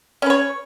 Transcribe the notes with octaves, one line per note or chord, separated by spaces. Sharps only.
C#4 B4 C#5